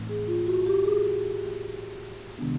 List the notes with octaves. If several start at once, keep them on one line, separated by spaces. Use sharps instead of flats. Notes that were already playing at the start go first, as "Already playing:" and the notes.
Already playing: A2 E3 A3 C4 D#4
G#4
F4
F#4
G4
G#4
C3 D#3 G#3 B3 D4